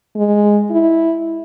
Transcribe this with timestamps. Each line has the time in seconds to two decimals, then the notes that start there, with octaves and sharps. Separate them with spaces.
0.16 G#3
0.71 E4